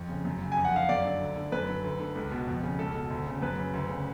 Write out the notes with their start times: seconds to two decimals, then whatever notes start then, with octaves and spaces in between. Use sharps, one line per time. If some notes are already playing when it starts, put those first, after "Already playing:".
Already playing: F2
0.09 C#3
0.25 F#2
0.42 C#3
0.52 G#5
0.57 F2
0.65 F#5
0.73 D3 F5
0.89 F#2 D5
1.05 D3
1.21 D2
1.36 D3
1.52 F#2 B4
1.69 D3
1.84 D2
2.00 D3
2.15 C#2
2.31 B2
2.47 F2
2.63 C#3
2.79 C#2 A4
2.95 B2
3.10 D2
3.27 C#3
3.42 F#2 B4
3.58 C#3
3.74 D2
3.89 C#3